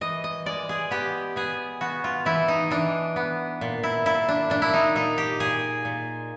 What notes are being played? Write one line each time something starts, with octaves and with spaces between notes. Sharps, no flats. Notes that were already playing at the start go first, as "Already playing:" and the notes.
E3 D#5
D#5
G#3 D5
G#4
B3 G4
B3 G#4
B3 F#4
F4
E3 E4
D#4
E3 D4
B3
A#2
E4
A#2 E4
D4
A#2 D4
E4
D#4
A#2 D#4
G4
A#2 G#4
A#2